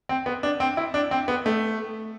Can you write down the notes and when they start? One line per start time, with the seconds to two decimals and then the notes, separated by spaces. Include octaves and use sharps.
0.09 C4
0.26 B3
0.43 D4
0.60 C4
0.77 E4
0.94 D4
1.11 C4
1.28 B3
1.46 A3